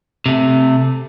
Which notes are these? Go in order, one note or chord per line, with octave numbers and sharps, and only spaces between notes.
C3 A3